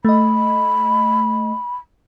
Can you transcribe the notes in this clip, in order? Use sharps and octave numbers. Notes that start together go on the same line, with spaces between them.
A3 D#5 B5